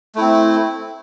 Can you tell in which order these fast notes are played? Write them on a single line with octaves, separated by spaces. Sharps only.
A3 E4 C4